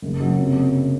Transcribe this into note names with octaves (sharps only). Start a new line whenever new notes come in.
F#1
F#3
C3